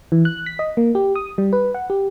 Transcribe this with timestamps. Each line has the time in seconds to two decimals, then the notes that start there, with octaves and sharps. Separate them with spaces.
0.12 E3
0.25 F#6
0.46 B6
0.59 D#5
0.77 A#3
0.95 G4
1.15 D#6
1.38 G3
1.53 B4
1.74 F#5
1.90 G4